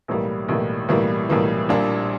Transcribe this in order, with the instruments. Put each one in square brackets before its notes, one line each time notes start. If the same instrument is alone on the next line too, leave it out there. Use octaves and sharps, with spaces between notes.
[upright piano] B1 A2 E3 G3 A#3
B1 A2 E3 G3 A#3
B1 A2 E3 G3 A#3
B1 A2 E3 G3 A#3
A#1 A#2 G3 A#3 D4